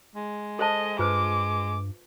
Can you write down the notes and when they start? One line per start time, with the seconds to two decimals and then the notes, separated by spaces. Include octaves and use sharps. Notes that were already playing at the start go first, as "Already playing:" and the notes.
0.15 G#3
0.59 A4 C5 D#5 A5
0.99 G2 F4 B4 C5 D6